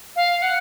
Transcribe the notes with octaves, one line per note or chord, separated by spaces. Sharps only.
F5
F#5